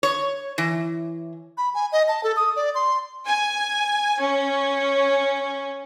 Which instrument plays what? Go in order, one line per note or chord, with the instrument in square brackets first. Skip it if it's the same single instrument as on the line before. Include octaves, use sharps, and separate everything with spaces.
[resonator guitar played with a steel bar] C#5
E3
[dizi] B5
G#5
D#5
A5
A4
D#6
D5
C6
[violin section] G#5
C#4